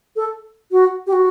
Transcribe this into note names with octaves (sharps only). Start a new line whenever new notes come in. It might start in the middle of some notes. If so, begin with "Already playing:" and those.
A4
F#4
G4
F#4